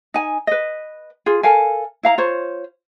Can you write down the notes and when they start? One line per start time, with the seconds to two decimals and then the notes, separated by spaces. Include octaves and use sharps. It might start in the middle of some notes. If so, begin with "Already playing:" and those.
0.14 D#4 G#5
0.47 B4 D#5
1.26 F4 G#4
1.43 A4 A#4 F5 G#5
2.03 E4 F5 A#5
2.18 F4 C5 C#5